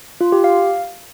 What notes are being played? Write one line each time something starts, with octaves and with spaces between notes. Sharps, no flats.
F4
G4
F5